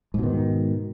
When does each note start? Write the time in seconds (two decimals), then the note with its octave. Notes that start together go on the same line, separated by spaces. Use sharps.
0.14 G#2
0.19 B2
0.23 D#3